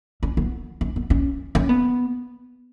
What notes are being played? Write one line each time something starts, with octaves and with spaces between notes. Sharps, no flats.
C#4
B3
C#4
B3
C#4
C#4
B3